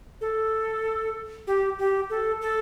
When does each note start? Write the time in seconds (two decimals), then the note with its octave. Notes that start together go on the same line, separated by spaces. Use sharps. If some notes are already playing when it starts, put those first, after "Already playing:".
0.21 A4
1.47 G4
1.78 G4
2.10 A4
2.42 A4